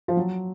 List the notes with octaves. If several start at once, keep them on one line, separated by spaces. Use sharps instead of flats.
F3
F#3